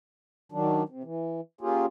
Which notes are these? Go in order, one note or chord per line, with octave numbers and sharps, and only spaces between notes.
D#3 F#3 D4
C3
E3
A#3 C#4 F4 G4 G#4